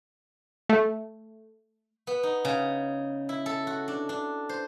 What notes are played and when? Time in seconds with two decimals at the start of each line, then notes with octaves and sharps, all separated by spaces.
0.69 A3
2.07 B3
2.23 D#4
2.45 C#3
3.29 E4
3.46 A4
3.67 F#4
3.88 D4
4.09 D4
4.49 C5